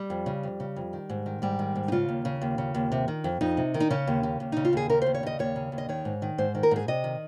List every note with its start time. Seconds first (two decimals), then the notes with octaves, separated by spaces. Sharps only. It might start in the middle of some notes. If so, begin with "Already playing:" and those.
Already playing: G3
0.10 F2
0.26 C#3
0.43 F2
0.60 C#3
0.76 F2
0.93 D#3
1.10 G#2
1.26 D#3
1.42 G#2 G3
1.59 D#3
1.76 G#2
1.88 D#4
1.92 C#3 F4
2.09 D#2
2.25 C#3
2.41 D#2
2.58 C#3
2.74 D#2
2.92 C3
3.08 D#3
3.24 F2
3.41 F2 D#4
3.57 C3
3.74 D#3
3.80 D#4
3.90 C#3 C#4
4.07 D#2
4.23 C#3
4.40 D#2
4.52 C#3 D#4
4.65 F4
4.73 D#2 G#4
4.89 C#3 A#4
5.02 D#2 C5
5.14 C#5
5.23 C#3 D#5
5.39 D#2 C#5
5.56 C#3
5.72 D#2
5.78 D#5
5.89 D#3 C#5
6.05 G#2
6.22 D#3
6.38 G#2 C5
6.55 D#3
6.63 A#4
6.71 G#2 G#4
6.88 C3 D#5
7.04 D#3